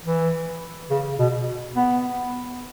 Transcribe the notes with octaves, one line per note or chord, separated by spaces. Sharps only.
E3
C#3
B2
B3